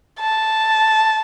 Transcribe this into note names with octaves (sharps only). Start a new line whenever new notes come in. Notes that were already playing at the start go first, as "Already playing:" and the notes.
A5